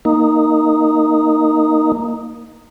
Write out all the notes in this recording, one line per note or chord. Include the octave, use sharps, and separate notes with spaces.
A#3 D#4